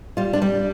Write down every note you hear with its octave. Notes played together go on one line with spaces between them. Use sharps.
G3 F4
D4
G3